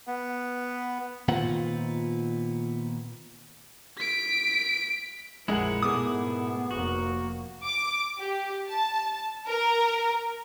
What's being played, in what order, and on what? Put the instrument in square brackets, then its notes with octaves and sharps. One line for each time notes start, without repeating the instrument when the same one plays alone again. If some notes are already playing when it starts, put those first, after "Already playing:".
[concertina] B3
[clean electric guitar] A#2 D#3 B3 C4 F4 F#5
[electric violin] B6 D7
[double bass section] A#1 F2 F3 [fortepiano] G#3 [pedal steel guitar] E4 A#4 F#5
[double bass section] G#2 B2 A3 [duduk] B3 [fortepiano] G#4 D6 D#6
[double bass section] F1 A#3 [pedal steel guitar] F#4
[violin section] D6
G4
A5
A#4